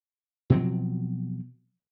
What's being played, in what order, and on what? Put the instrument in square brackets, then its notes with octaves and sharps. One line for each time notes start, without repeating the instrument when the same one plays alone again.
[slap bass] B2 F3 F#3 C4